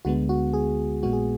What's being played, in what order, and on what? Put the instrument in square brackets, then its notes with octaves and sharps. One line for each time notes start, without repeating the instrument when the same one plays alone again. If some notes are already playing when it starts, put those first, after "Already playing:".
[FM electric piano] D2 D3 G#3 B3 F#4
F#4
G#4
A#1 A#2 G#3 B3 F#4
G#4